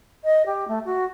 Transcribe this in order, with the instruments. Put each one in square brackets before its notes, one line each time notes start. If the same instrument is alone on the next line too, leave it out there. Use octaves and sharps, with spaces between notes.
[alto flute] D#5
G4
A3
F#4